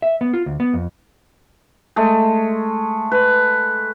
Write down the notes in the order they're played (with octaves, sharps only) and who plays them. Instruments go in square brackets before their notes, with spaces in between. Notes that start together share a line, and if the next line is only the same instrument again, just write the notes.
[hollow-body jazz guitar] E5
B3
F4
D2
B3
F2
[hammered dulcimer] G#3 A3
B4